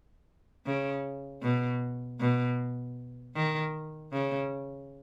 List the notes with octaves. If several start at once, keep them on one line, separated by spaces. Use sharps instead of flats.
C#3
B2
B2
D#3
C#3